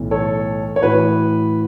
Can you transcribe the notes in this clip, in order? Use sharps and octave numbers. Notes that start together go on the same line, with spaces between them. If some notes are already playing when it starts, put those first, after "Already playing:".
Already playing: B1 A2 E3
A4 C#5
C#5
A2 E3 F#4 B4